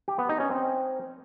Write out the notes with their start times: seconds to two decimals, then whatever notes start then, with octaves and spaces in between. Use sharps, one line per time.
0.08 G4
0.19 B3
0.29 D#4
0.40 C#4
0.51 C4